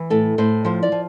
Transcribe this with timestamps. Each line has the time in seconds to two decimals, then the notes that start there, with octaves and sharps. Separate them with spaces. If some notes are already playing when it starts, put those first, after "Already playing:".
Already playing: E3
0.10 A2 A4
0.38 A2 C5
0.65 F3 C5
0.83 D5
0.92 F3